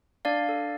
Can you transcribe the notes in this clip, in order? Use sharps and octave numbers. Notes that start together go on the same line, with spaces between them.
D4 D5 F5
A4